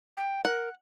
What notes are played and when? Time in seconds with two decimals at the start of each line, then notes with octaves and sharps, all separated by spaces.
0.17 G5
0.45 A#4 F#5